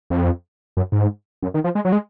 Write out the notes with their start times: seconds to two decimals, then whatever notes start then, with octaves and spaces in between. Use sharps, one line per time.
0.10 F2
0.77 F#2
0.92 G#2
1.43 F#2
1.54 D#3
1.64 F3
1.75 G#3
1.85 F#3
1.92 G#3